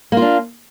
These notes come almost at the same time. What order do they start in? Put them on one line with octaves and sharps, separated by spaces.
A#3 F4 D4